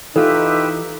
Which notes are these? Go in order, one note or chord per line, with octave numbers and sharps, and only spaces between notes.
E3 D#4 F4 G4 A4 B4 E5